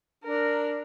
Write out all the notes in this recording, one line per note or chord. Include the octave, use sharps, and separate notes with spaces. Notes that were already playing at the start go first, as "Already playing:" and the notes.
D4 A#4